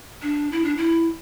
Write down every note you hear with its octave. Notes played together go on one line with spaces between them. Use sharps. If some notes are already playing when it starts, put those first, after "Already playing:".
D4
E4
D4
E4